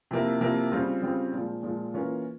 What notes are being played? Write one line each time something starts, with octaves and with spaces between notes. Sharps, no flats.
C3 F3 A#3 E4
C3 F3 A#3 E4
C#3 G3 C4 F4
C#3 G3 C4 F4
A#2 F3 G#3
A#2 F3 G#3
E3 A#3 C#4 F4